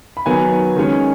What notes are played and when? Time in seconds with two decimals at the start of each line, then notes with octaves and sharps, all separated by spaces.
0.17 B5
0.26 D#3 F#3 B3 G#5
0.76 D#3 G#3 C#4